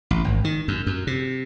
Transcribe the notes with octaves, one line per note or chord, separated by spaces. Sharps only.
A1
G#1
D#3
F#2
F#2
C3